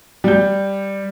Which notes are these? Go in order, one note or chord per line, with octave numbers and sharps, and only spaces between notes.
G3 G6